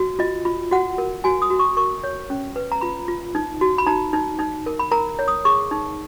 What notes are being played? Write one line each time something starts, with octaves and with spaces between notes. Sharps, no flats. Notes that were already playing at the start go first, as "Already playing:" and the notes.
Already playing: F#4
F4 D#5
F4
F#4 F#5
A#4
F#4 G#5
D#6
F#4
C#6
A#4 C#6
C#5
C#4
B4
A#5
F4 B5
F4
D#4
F#4
B5
D#4 A#5
D#4
D#4
A#4
B5
A#4 A#5
C#5
D#6
G#4 C#6
D#4